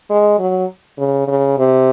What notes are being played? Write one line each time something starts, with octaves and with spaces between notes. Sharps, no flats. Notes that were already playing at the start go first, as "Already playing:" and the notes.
G#3
F#3
C#3
C#3
C3